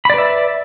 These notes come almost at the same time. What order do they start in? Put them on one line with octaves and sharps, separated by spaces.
B5 D5 B4 E5